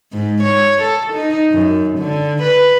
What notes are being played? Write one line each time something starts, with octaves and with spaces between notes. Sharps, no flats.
G#2
C#5
A4
D#4
F#2
D3
B4